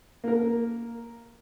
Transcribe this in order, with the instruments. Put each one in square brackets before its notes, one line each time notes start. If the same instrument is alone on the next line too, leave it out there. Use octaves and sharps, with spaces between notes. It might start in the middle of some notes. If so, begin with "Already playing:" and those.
[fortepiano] A#3 A#4